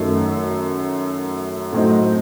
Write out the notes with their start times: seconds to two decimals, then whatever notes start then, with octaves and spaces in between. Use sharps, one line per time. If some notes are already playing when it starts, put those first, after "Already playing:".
Already playing: F#2 D#3 A3
1.73 A2 F#3 C4 D#4